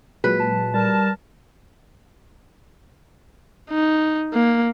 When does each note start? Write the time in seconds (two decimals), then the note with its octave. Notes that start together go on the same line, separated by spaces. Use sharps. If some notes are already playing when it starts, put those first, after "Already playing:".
0.24 A#2 F#3 G#3 B4
0.39 A5
0.74 G3 A#4 A5
3.70 D#4
4.34 A#3